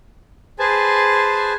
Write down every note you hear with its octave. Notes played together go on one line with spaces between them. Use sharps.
G#4 B4 C5 G#5 A5